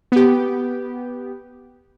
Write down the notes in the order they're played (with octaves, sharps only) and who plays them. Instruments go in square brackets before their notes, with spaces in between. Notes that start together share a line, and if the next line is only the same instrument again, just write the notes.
[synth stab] B3 G4